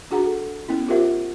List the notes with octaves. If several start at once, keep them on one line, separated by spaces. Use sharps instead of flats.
D4 F#4 G#4 F#5 A#5
A4
B3 C#4 E4
F4 G4 A#4 C5 E5 F#5